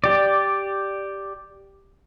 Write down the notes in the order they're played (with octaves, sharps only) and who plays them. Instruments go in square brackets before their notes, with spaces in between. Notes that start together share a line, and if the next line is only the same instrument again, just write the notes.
[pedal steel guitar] G4 D5